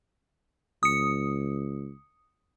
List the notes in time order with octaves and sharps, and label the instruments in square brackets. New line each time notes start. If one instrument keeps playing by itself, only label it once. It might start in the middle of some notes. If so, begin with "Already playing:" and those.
[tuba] C#2 [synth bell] D#6 C#7